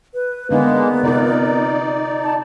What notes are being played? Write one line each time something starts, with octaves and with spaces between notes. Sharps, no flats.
B4
D3 G#3 A#3 B3 D4 D#4
C3 D#4 F4 A#4 D5
A5